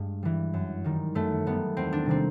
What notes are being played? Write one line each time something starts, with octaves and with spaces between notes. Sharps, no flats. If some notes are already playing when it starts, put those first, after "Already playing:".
Already playing: G2 G#3
E3 G3
F#2
D#3 G3
F#2 A3
D#3 G3 B3
E2 C4
D4
C3 D#3 G3 C4